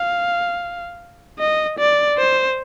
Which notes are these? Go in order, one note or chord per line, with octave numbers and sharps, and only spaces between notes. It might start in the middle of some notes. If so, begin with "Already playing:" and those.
Already playing: F5
D#5
D5
C5